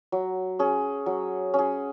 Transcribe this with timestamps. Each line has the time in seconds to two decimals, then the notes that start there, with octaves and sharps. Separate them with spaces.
0.12 F#3
0.59 C#4 G#4
1.06 F#3
1.54 C#4 G#4